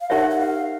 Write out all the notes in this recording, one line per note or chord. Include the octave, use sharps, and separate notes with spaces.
F5
D#4 G4 A#4 C#5 E5 F#5
F#5
F5